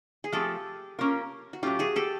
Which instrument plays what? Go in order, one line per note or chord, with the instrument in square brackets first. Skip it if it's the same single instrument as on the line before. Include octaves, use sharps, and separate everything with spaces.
[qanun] G#4
[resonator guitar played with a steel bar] F3 A3 C4 [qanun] G4 A4
[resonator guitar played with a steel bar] A#3 C#4 F4 A#4
[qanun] F#4
[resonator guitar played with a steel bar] A2 F#3 A3 C#4 [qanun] F4 G4
[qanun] F#4 G#4
G4 A4